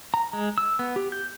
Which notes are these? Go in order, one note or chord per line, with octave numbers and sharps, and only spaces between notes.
A#5
G#3
E6
B3
G4
G6